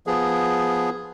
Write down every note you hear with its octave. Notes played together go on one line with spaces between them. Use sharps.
F3 B3 G#4